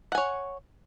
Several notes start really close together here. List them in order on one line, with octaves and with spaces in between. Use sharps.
F#5 G#5 C#5